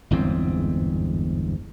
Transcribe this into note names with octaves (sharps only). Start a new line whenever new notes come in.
G1 E2 G#2 C4